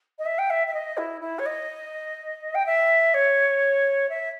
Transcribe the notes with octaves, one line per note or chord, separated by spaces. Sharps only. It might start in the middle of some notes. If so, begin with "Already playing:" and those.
D#5
E5
G5
E5
E5
D#5
E4
E4
C#5
D#5
G5
E5
C#5
E5